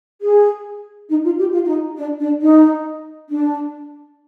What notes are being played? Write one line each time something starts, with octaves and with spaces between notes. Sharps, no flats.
G#4
D#4
F4
G4
F4
F4
D#4
D4
D4
D#4
D4